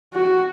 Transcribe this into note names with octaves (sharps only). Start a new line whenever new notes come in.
F#4